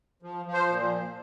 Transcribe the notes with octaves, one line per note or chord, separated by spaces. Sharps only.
F3
F3
C5
A#2